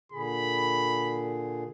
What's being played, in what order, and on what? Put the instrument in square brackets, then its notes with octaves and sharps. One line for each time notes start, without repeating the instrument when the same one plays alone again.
[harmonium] A#2 D3 G#4 [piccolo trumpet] B5